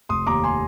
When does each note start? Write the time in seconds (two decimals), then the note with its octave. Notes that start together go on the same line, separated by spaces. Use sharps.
0.09 F1 C6 D#6
0.27 D#2 A#5 D6
0.44 G#5 C6